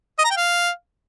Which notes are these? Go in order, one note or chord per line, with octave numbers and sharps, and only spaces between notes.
D#5
A#5
G5
F5